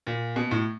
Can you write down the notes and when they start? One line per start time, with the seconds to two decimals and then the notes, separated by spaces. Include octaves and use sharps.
0.07 A#2
0.36 B2
0.51 A2